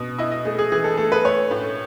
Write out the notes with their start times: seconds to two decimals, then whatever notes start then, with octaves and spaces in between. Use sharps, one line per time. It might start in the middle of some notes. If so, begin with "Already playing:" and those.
Already playing: B2
0.18 E4 D#5
0.32 D#5
0.45 A3 G#4
0.59 G#4
0.72 E3 G#4
0.84 A4
0.97 A3 A4
1.12 B4
1.24 A3 C#5
1.51 A2